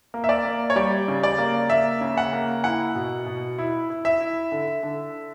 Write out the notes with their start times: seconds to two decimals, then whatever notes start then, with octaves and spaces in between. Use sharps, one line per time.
0.14 A#3
0.24 E5
0.29 D5
0.45 A#3
0.70 C#5
0.76 G3 D5
1.08 C#3
1.23 D5
1.38 A#3
1.70 A#3 E5
2.01 C#3
2.18 F#5
2.33 A#3
2.64 E4 F#5
2.95 B2
3.26 B2
3.59 E4
3.90 E4
4.05 E5
4.20 E4
4.52 D3
4.83 D3